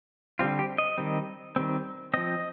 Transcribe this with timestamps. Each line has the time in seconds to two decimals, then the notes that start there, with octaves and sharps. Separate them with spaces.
0.39 D3 G3 C4 F4
0.59 G4
0.78 D#5
0.98 D#3 G3 C4
1.56 D#3 G3 C4
2.14 F3 C4 D#5